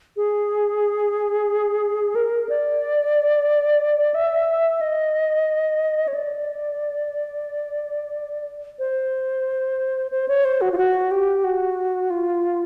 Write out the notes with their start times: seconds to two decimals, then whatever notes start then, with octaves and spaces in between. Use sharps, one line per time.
0.17 G#4
2.15 A#4
2.49 D5
4.14 E5
4.81 D#5
6.08 C#5
6.14 D5
8.79 C5
10.11 C5
10.28 C#5
10.45 C5
10.61 F#4
10.72 F4
10.78 F#4
11.11 G4
11.44 F#4
12.10 F4